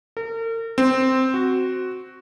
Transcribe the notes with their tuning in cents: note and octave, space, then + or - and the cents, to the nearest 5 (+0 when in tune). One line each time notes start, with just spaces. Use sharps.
A#4 -40
C4 -5
F#4 +5